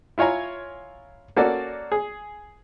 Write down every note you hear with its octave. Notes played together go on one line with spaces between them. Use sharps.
E4 F4 C#5 G#5 A#5
A#3 C#4 F#4 A4 D5
G#4